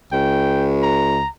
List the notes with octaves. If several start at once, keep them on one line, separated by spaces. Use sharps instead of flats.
C#2 G5
A#5